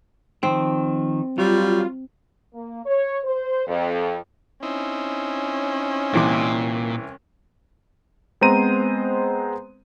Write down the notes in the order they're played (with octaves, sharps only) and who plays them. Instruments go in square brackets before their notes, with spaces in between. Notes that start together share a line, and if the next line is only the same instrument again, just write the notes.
[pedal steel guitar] D#3 F3 [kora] C4
[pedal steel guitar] F#3 [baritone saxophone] G3 [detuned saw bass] F4
[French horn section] A#3
C#5
C5
F2
[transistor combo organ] C4 D#4 E4 [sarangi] C#4
[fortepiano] C2 E3 D6 [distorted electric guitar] A#2
[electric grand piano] G#3 B3 C4 C5 A#5 D#7